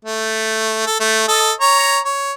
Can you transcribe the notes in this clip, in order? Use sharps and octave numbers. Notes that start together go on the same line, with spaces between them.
A3
A4
A3
A4 D#5
C#5 A#5
C#5